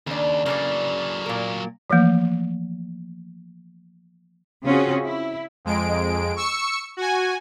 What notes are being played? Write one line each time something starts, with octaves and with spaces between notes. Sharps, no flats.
D#2 C#3 D4
C#3 E3 F#3 A#3 A4 D5
A#2 A#4
E3 F3 A3 A#3
C#3 C4 C#4 F4 F#4 G#4
E4
F2 G#3 D7
C#6 E6 C#7
F#4 G#5